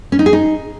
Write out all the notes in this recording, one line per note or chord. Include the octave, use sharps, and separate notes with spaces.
C#4
D#4
G#4
D#4